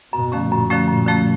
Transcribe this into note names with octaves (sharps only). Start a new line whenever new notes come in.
F#2 B2
D3 F3 A3 C#4
F#2 A#2
D3 F3 A3 C#4
F#2 A#2
D3 F3 A3 C#4